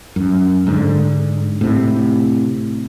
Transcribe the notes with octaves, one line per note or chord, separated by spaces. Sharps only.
F#2
G#2 D3
A2 C3